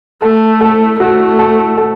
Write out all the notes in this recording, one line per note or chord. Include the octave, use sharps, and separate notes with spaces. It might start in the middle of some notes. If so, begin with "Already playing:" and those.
A3 A4
A4
A3 F#4
A4
A4